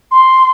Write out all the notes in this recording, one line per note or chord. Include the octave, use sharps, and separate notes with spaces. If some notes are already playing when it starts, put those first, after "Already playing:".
C6